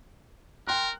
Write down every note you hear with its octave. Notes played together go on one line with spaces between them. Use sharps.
A#4 G5 C6 F#6